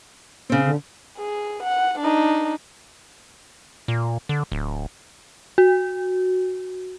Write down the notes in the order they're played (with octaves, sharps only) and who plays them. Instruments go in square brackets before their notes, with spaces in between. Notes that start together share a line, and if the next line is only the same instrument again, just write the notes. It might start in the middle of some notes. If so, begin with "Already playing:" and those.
[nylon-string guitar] C#3 C4 [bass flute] C#4
[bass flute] D3
[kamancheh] G#4
F#5
D4 D#4
[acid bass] A#2
D3
D1
[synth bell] F#4